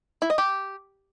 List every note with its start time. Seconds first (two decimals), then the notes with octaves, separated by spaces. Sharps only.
0.22 E4
0.30 D#5
0.38 G4